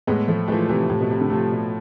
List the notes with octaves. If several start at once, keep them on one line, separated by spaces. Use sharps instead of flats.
A2 G#3 B3
F3 A3
E3 F3 G#3 A3
C3 E3
A2 C3
B2
C3
D3
C3 F3 A3
B2